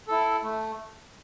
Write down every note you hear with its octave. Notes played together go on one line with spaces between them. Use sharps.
E4 A4
A3